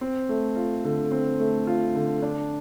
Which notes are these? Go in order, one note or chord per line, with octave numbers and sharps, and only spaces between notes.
C4
A3
F4
D3
C4
A3
F4
D3
D4